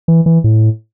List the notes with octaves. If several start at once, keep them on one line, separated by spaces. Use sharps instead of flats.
E3
E3
A2